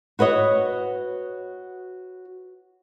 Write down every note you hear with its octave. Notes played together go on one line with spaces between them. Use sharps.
F#4 B4 C#5 D#5